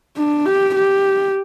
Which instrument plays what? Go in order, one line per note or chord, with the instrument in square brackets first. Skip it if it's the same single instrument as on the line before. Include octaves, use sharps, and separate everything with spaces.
[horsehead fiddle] D4
G4
G4